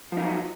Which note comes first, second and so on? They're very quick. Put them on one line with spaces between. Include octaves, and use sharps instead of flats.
F3 D#4 F#3